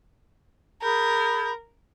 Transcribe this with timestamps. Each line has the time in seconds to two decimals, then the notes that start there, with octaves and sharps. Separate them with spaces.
0.83 G#4 A#4 B5 G6